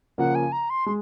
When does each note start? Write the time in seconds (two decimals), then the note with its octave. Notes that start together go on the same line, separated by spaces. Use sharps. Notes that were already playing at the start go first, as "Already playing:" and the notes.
0.18 C#3 F3 A#3 F#5
0.35 G#5
0.52 A#5
0.70 C6
0.86 G#3 C6